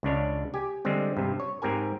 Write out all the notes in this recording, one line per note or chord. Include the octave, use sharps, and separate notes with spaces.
C#2 C#3 D4 C#5
G4 G#5
D3 G3 G#3 C4
G2 C3
C#5
G#2 C4 G4 A#4 G#5